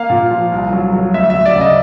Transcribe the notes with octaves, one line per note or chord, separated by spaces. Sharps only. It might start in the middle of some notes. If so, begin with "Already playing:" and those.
Already playing: A#3 F5
A#2
F3
C2
F#3
F#3
D2 E5
D2 E5
D5
C#3
D#5